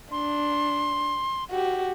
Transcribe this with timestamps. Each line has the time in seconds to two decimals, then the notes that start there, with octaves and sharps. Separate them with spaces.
0.12 D4 C6
1.51 F#4 G4